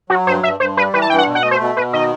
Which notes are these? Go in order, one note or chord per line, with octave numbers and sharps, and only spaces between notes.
F#3 F#4
G2 C5
G2 E5
G2 C5
G3 B4
E3 B4
A5
G2 G5
F#5
B2
F#5
A3 D#5
C5
B2
B2 B4
D#3 D#5